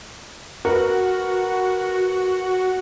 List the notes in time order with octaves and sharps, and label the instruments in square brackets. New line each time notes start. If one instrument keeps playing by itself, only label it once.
[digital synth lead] F#4 [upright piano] A#4 B4